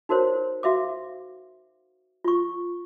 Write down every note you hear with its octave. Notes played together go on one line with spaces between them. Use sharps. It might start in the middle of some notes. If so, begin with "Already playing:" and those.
D#4 F#4 A#4 C5 C#5
F#4 E5 F5 D6
F4 C#6